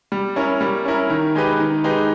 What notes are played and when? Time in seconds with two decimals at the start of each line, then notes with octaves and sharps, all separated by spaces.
0.12 G3
0.36 C#4 E4 A#4
0.61 G3
0.85 C#4 E4 A#4
1.10 D#3
1.35 G#3 D#4 G4 B4
1.60 D#3
1.84 G#3 D#4 G4 B4